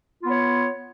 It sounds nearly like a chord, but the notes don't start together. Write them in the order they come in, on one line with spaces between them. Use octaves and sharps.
F4 B3 C#5